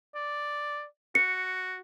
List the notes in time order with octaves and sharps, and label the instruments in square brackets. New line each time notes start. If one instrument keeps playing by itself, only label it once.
[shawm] D5
[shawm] F#4 [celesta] C#7